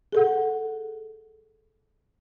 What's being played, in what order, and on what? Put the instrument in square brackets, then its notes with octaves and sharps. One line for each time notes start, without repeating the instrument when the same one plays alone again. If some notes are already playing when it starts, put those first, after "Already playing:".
[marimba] G#4 A4 F#5